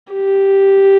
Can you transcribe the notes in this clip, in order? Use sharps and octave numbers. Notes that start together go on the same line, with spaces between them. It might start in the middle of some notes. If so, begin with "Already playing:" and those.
G4